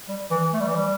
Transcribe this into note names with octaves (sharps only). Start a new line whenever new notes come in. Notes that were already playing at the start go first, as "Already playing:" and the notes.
G3
E3
A3
G3
E3
G3